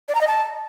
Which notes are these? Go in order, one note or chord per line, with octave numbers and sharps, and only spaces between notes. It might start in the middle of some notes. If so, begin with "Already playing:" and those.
D5
A#5
D#5
A5